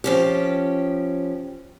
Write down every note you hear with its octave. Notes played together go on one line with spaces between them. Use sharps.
F3 C#4 G4